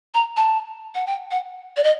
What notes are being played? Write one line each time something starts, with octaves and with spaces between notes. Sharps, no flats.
A#5
A5
F#5
G5
F#5
D5
D#5